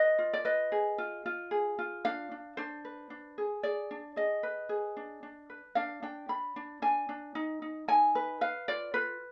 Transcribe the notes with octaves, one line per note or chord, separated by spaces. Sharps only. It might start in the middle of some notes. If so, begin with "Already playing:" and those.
Already playing: B4 D#5
F4
D5
B4 D#5
G#4
F4
F4
G#4
F4
D4 F5
D4
D4 C5
B4
D4
G#4
G#4 D5
D4
G#4 D#5
B4
G#4
D4
D4
B4
D4 F5
D4 G5
D4 B5
D4
D4 G#5
D4
D#4
D#4
D#4 G#5
B4
B4 F5
F4 D5
F4 B4